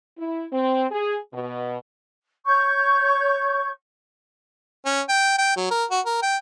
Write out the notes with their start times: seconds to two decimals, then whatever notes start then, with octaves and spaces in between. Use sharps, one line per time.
0.19 E4
0.53 C4
0.91 G#4
1.34 B2
2.45 C#5 C#6 G6
4.86 C#4
5.09 G5
5.38 G5
5.57 F#3
5.71 A#4
5.91 F#4
6.06 A#4
6.23 G5